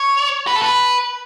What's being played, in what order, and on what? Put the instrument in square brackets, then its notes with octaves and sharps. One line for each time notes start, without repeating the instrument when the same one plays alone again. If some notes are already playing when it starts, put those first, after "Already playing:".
Already playing: [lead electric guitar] C#5
B4
A4
B4